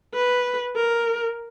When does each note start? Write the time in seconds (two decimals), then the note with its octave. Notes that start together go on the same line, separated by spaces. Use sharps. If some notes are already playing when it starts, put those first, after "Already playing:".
0.14 B4
0.76 A#4